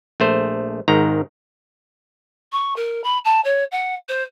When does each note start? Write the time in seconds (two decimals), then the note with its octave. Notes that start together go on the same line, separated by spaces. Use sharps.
0.20 A#1 A3 C5
0.88 G#1 G#2 D#3 A#5
2.52 C#6
2.76 A#4
3.03 B5
3.24 A5
3.44 C#5
3.71 F#5
4.08 C5